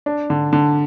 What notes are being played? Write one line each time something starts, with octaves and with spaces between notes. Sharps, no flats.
D4
D3
D3